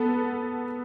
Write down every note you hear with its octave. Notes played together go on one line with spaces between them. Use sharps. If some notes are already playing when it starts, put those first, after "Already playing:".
Already playing: B3 A4